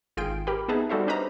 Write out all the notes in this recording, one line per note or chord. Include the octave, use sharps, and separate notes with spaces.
G#1 F4 G#4 G5 D7
G4 A#4 G5 B5
B3 D#4 G#4 B4 E5 A5
G3 F#4 A4 C5 E5
C#4 D4 B4 C5 D#5 A#5